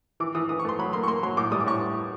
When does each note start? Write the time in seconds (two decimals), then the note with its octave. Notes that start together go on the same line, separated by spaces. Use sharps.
0.20 E3 D6
0.35 E3 D#6
0.49 E3 D#6
0.59 C#6
0.65 A3 C6
0.79 F#3 B5
0.93 A#3 C6
1.03 C#6
1.08 A#3 C6
1.23 F#3 C6
1.37 A2 D6
1.52 G3 D#6
1.60 D6
1.67 A2 C#6